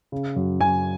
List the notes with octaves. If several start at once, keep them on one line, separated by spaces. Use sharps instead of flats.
C#3
F#2
F#2 G#5